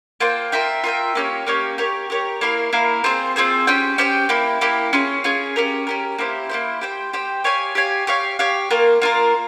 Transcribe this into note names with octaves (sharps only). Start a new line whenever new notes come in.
A#3 F4 C5 G5
F4 A#4 E5 G5
F4 A#4 E5 G5
A#3 C#4 G4 C#5
A#3 C#4 G4 C#5
G4 A#4 C#5
G4 A#4 C#5
A#3 E4 A#4 F5
A#3 E4 A#4 F5
C4 F4 G#4 C5
C4 F4 G#4 C5
C#4 G4 C5 G5
C#4 G4 C5 G5
A#3 E4 G4
A#3 E4 G4
C#4 F4 G#4
C#4 F4 G#4
C#4 G4 A#4
C#4 G4 A#4
A#3 E4 G4 C5
A#3 E4 G4 C5
G4 C5 G5
G4 C5 G5
G4 C#5 F5 G#5
G4 C#5 F5 G#5
G4 C#5 F5
G4 C#5 F5
A#3 F4 A#4
A#3 F4 A#4